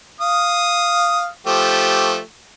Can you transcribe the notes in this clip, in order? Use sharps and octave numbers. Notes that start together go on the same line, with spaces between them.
F5 D#6
F3 A3 G4